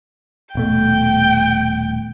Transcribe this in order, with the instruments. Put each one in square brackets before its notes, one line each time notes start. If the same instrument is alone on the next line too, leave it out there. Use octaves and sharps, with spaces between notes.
[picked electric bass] D#1 B2 A3 [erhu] G5